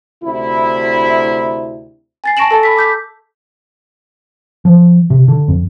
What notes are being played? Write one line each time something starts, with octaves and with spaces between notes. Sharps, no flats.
D2 C3 E4
G#5 A6 C7
A5 C#6 A#6 D7 E7 F#7
A4 A5 A6
B5 E6 B6
D6 G6 B6
F3
C3
D3
F2